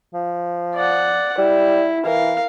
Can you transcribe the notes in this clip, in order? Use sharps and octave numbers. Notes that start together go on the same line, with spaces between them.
F3
D5 F#5
G3 E4
E3 A#4 F5